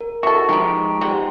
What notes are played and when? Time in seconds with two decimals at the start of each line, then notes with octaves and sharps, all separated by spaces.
0.01 A#4
0.23 E3 F#4 A4 C#6
0.49 F3 G#3 B3 C4 D#4 G4 A#5
1.01 G3 G#3 B3 C4 F#5 C6